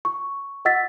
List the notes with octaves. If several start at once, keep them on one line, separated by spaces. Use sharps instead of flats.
C#6
D#5 F#5 E6 A6 B6